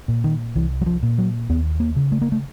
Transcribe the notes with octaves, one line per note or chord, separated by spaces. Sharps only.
A#2
D#3
C2 E3
F#3
F3
A#2
F#3
D#2 B3
A#3
C#3
A3
A#3
A3